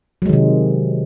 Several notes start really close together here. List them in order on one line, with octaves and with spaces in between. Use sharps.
F#3 G#3 D#3 C3